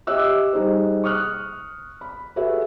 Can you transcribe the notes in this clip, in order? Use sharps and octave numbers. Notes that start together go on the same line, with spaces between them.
G4 C#5 D#5 E5 E6 F#6
G3 D#4 G#4 C5
C#6 D#6 F6 F#6
B5
F#4 G#4 A4 B4 C#5 E5